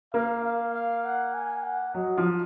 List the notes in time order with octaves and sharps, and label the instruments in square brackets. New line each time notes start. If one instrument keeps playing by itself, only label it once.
[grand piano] A#3 [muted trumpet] F5
[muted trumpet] F5
F5
F#5
G#5
F#5
[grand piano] F#3 [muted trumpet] D#5
[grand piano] F3